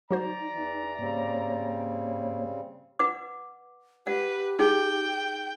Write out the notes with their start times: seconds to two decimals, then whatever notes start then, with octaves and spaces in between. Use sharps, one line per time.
0.11 F#3 D#4 F#4 C5 D5 A#5
0.52 E2 E3
0.99 G#2 C#3 G3 A#3 C4 C#5
2.99 B4 F#5 D6
4.07 G4 B4 F#5
4.59 D#4 G#4 G5